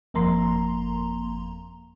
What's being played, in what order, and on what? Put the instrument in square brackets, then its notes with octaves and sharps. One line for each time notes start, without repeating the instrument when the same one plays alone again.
[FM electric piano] G1 F2 A#3 A#5 C6